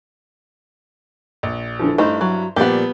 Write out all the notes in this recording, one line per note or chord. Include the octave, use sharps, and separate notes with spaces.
A#1
D3 E3 F3
G2 A3 D#4 E4 C5
F#3
A#2 F3 G3 B3 G4